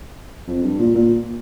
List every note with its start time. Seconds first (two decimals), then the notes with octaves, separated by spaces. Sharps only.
0.47 F2
0.63 G2
0.79 A#2
0.95 A#2